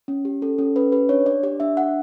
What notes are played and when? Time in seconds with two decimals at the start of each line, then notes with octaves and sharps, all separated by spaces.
0.08 C#4
0.25 G4
0.42 C#4 A4
0.58 C#4 A4
0.76 C#4 B4
0.92 G4 B4
1.09 D4 C#5
1.26 D4 D5
1.43 G4 D5
1.60 D4 E5
1.77 D4 F#5